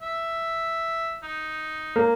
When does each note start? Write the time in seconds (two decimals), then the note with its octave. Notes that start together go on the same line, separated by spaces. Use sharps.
0.02 E5
1.23 D#4
1.96 A#3